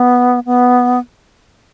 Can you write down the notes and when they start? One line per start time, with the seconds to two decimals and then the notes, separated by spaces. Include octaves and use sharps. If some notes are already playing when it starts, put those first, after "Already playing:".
Already playing: B3
0.46 B3